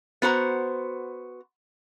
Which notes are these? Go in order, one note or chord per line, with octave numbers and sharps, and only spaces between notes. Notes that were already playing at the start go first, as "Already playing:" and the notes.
B3 F#4 C5 A#5